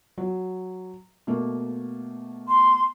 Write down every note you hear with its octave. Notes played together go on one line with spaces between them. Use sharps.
F#3
B2 A3 A#3
C6